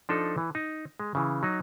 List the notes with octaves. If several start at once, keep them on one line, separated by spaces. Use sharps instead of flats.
F3 D4 D#4 A4
E3
D#4
G#3
C#3 E3
F#3 D#4